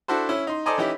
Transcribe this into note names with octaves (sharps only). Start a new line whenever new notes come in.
D4 E4 F#4 A4 C5
C#4 E4
D#4 C6
A4 C5 D5 D#5 G#5 A#5
E3 C#4 D#4 E4 G4